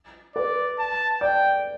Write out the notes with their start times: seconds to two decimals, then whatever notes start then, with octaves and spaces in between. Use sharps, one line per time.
0.35 B4 D5
0.79 A5
1.21 D5 G5